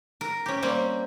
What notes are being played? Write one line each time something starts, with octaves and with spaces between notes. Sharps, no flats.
A#4
C#4 G4
G3 A#3 C4 C#4